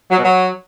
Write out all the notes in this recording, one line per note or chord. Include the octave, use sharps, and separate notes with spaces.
F#3
B2
F#3